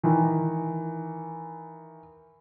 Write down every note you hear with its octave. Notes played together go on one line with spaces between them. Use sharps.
D#3 E3